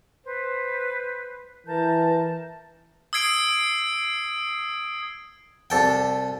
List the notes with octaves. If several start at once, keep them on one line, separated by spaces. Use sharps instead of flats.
B4 C5
E3 A#4 A5 G6
D#6 E6 G#6 C7 D7
C2 A4 G5